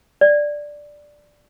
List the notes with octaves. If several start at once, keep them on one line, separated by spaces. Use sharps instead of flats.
D5